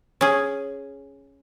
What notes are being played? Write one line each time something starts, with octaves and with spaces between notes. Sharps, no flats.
C#4 G#4